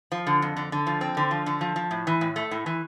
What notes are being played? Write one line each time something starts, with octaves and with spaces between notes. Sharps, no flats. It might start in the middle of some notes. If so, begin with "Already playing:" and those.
F3
D3
F2
D3
D3
F3
C4
D3
F3
D3
F3
F3
A2
E3
A2
A3
A2
E3